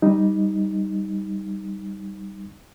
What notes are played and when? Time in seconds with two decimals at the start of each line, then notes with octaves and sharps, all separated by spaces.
0.02 G3 D#4